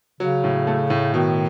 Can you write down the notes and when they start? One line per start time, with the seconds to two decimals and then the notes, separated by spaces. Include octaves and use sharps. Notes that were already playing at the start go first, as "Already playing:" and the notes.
0.20 C#3 F#3
0.44 A2
0.67 A3
0.90 A2
1.14 B2 D#3